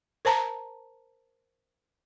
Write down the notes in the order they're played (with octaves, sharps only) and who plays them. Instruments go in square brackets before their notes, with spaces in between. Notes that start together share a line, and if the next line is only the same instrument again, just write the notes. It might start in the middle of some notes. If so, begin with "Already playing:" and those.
[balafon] A#4 C5 A5 A#5